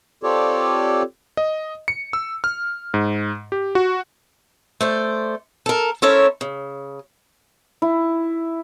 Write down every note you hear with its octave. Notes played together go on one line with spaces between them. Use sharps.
C4 F4 G4 A4 C#5 D5
D#5
C#7
E6
F6
G#2
G4
F#4
A3 C5 D5
A4 A#4
C#4 E4 A4 A#4 C5 C#5
C#3
E4